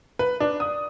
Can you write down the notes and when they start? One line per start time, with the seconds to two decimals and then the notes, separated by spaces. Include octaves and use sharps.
0.19 B4
0.40 D4
0.60 D#6